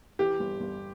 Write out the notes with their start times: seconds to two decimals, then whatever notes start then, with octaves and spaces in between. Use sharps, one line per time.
0.19 E3 G4
0.40 G1
0.60 G1